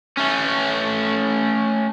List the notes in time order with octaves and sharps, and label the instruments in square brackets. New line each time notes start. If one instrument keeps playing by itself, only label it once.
[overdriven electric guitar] A3 C#4